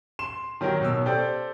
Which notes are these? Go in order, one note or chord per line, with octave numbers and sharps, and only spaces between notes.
C6 E7
D#3 F#3 G4 A#4
B2 C#4 E6
G4 A4 C5 D5